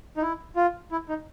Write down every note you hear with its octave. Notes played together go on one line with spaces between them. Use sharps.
D#4
E4
F4
E4
D#4